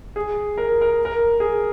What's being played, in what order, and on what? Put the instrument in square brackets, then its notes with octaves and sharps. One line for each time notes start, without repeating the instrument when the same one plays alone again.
[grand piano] G#4
A#4
A#4
A#4
G#4